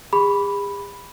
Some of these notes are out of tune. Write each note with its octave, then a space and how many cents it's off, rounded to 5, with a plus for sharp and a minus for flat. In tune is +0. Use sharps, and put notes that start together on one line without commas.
G#4 -45 B5 +0 D6 -20